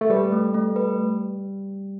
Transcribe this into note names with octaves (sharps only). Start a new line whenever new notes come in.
A3
G3 B4
A3
A3
B4